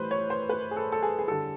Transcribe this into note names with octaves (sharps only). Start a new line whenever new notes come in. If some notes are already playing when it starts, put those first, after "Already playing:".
Already playing: A2 E3 G3 B4 C5
C#5
C5
B4
G#4
A4
A4
G#4
G#4
D3 G3 A4